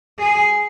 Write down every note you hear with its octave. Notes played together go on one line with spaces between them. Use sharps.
G#4